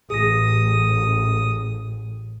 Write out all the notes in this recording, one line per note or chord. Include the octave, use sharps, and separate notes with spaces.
A1 G#4 D#6 A#6